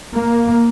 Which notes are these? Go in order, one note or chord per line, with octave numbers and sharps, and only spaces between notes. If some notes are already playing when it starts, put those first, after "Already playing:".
A#3